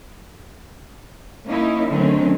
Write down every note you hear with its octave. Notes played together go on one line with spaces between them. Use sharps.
A#3 C#4 D#4 E4
D3 D#3 F#3 A3 C4 C#4